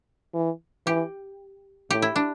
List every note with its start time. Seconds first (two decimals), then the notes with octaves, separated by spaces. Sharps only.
0.34 E3
0.86 E3 G4
1.91 A2 G4
2.02 E4
2.16 D4